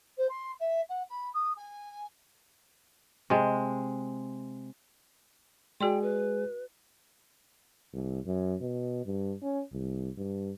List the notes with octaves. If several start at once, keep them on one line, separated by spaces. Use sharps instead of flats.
C5
C6
E5
F#5
B5
D#6
G#5
C3 G#3
G#3 F#4 G#4 D5 G5 C6
B4
C2
F#2
B2
G2
C#4
C2
G2